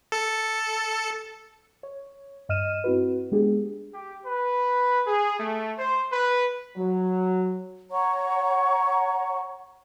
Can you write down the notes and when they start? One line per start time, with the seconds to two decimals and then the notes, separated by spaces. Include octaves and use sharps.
0.12 A4 C#7
1.83 C#5
2.49 G2 D#5 F6 D#7 E7
2.84 C4 E4 F#4 B4
3.32 G#3 B3 D4 G4 G#4
3.94 G4
4.25 B4
5.07 G#4
5.39 A3
5.79 C5
6.12 B4
6.77 F#3
7.91 C#5 F#5 A#5 C#6